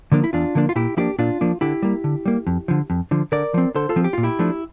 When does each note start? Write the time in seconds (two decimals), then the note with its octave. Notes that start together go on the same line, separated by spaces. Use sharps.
0.12 D3 F3 A#3 D4
0.24 E4
0.33 E2 D4 F4
0.55 D3 F3 A#3 D4
0.69 F4
0.76 A#2 E4 G4
0.97 F3 A#3 D4 E4 G4
1.19 A#2 D4 F4
1.41 F3 A#3 D4
1.61 D3 E4 G4
1.82 G3 A#3
2.04 D3
2.25 G3 A#3
2.47 F2
2.68 D3 F3
2.90 F2
3.11 D3 F3
3.32 D3 A#4 D5
3.54 F3 C4
3.75 D3 A4 C5
3.89 F4 A4
3.96 F3 C4
4.04 G4
4.13 A#2 F4
4.23 E4 G4
4.39 F3 A3 D4